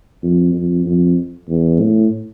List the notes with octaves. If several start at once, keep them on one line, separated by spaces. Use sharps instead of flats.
F2
F2
F2
E2
A2